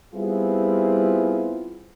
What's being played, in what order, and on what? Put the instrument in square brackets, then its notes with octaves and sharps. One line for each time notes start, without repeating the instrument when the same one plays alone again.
[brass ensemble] G3 B3 C4 E4 F4 G#4